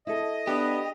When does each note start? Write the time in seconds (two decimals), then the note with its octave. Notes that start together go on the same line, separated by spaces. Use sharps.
0.07 E4 A4 D#5
0.47 B3 D4 G4